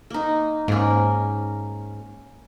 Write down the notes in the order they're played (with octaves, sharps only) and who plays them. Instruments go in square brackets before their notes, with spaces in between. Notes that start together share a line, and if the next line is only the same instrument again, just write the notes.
[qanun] A#3 D#4
[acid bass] G#2 [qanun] A#3 C#4